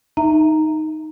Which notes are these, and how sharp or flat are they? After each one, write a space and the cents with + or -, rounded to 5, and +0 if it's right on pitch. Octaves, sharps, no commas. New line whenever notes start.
D#4 +0 E5 +0 A#5 -10